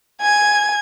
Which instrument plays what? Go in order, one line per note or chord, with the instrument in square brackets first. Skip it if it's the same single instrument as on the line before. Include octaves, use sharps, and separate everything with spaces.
[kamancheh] G#5 [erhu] G#6